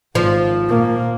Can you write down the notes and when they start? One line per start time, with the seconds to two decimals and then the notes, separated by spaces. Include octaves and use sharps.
0.15 G#1 F3
0.67 A#2 A#3